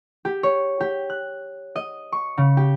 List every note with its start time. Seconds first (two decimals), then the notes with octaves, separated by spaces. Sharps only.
0.25 G4
0.43 C#5
0.80 G4
1.10 F#6
1.76 D#5
2.12 C#6
2.38 C#3
2.57 G4